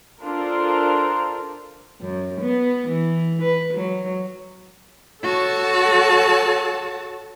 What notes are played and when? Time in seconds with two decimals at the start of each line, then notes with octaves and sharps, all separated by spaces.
0.23 D4 F4 A4 A#4 C5
2.01 F#2
2.41 B3
2.87 E3
3.42 B4
3.73 F#3
5.22 F#4 A4 C#5 A5